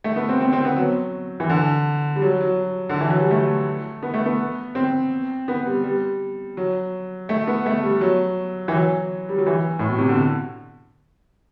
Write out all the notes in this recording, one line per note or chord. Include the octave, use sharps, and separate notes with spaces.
A3
B3
C4
C4
C4
B3
F#3
E3
D3
G3
F#3
F#3
D3
E3
F#3
G3
A3
B3
A3
B3
C4
B3
G3
G3
F#3
A3
B3
A3
G3
F#3
E3
F#3
G3
F#3
E3
A2
B2
C3
D3